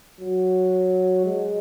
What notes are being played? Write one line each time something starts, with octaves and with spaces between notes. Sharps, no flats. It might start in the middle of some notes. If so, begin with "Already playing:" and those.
F#3
G#3